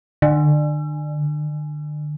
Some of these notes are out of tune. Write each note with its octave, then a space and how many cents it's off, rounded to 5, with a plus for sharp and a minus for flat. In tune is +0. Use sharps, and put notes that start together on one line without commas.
D3 +35